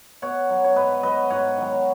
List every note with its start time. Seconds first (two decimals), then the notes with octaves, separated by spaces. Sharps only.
0.22 B2 C#5 F#5
0.50 F#3
0.64 C#5
0.76 G#2 B4 D#5
1.03 F#3 B4 D#5
1.30 G#2 C#5 F#5
1.57 D#3 F#3